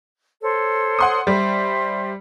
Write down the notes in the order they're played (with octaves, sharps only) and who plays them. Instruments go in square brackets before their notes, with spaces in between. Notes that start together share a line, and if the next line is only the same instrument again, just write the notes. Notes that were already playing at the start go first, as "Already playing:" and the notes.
[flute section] A4 C5 C#5
[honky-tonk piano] F#5 C6 D#6
[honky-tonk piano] G3 [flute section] C5 E5